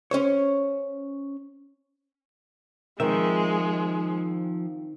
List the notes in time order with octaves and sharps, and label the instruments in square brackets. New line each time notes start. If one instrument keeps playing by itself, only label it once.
[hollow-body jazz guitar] C#4 C5 C#5
[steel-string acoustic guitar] D#3 C4 [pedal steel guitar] F3 E5 [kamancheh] G#3